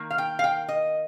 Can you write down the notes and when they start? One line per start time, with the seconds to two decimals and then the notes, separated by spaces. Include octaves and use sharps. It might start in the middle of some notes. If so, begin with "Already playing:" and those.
Already playing: D#3 A#3
0.10 F5
0.18 G5
0.39 F5
0.44 G5
0.69 D#5